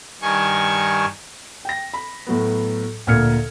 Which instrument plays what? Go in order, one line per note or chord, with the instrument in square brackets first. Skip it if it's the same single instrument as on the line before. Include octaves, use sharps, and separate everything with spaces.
[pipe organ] G2 D#3 G#5 C#6
[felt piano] G5 A#6
B5
A2 F#3 B3
D2 A#2 A#4 F6 G#6 C#7